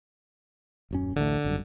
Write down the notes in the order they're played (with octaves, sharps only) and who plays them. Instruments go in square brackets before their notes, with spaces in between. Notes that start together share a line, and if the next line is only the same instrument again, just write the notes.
[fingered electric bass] D#1 F#2 C#4
[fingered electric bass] A1 D2 A3 [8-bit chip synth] D3
[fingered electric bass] G#1 F#2 G3